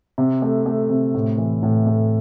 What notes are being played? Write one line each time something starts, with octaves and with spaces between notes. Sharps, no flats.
C3
A3
A3
C3
A2
E3
A2
A3